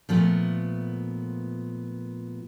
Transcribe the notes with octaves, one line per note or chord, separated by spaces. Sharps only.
A#2 F3 A3 B3